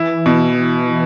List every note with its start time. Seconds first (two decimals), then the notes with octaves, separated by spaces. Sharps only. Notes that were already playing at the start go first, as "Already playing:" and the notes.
Already playing: E3 E4
0.26 B2